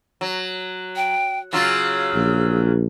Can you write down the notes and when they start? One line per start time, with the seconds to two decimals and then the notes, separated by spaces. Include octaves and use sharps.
0.21 F#3
0.96 G5
1.53 C#3 F#3 F4 E6
2.15 A#1